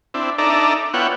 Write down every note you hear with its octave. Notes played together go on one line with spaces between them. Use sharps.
C4 D4 E4
D4 D#4 A4 D5 E5 A#5
B3 E4 F4 C#5 F#5 G5